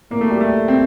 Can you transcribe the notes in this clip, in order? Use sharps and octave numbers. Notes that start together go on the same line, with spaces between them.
A2 A#3
A3
G3
G3 A3
C4